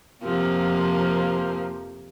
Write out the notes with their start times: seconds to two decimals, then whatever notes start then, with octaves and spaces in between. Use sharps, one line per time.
0.23 F2 C3 F3 A#3